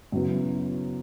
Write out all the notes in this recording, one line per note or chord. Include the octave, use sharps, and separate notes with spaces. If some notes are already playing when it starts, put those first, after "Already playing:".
F#2 C#3 F#3 B3 E4